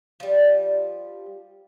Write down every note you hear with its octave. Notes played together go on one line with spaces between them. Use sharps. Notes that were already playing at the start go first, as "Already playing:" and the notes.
F3 G3